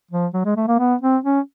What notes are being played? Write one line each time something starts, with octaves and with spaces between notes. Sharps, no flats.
F3
F#3
G#3
A3
A#3
B3
C4
C#4